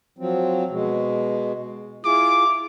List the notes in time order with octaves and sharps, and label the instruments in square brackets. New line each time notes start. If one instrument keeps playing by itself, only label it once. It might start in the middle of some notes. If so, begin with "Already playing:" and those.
[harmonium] F3 F#3 C4
B2 G#3
[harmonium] E4 F4 G#4 [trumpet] D6